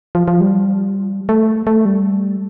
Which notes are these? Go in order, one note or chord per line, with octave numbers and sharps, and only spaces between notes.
F3
F3
G3
A3
A3
G3